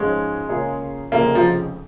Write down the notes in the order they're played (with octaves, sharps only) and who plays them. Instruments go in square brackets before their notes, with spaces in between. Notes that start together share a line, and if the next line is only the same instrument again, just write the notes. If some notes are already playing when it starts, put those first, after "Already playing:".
Already playing: [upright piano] G#2 F3 C#4 F4 C#5 [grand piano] G#3
[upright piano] C#3 A#3 F4 G#4 C#5
[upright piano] F1 F2 C#3 G#3 F4 [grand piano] A#3
[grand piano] F3